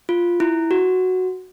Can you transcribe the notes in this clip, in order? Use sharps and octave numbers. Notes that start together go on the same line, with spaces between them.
F4
E4
F#4